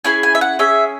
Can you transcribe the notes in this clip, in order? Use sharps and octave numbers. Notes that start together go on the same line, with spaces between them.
C#4 E4 G#4 G#5
G#5
E5
F#5
C#4 G#4 E5